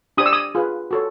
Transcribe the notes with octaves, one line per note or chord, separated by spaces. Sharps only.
D4 G4 C5 D#6
E6
D#6
F4 G#4 B4
F#4 A4 C#5